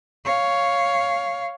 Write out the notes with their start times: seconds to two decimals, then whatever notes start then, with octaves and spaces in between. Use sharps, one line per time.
0.25 C#5 F5